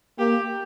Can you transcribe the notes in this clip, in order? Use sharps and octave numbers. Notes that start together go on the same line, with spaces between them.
A#3 G4